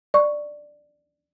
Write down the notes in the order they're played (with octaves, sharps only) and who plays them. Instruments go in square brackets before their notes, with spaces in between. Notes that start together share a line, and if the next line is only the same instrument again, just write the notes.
[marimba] D5 C#6